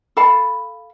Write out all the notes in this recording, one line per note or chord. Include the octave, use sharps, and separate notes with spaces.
A4 F5 A5 B5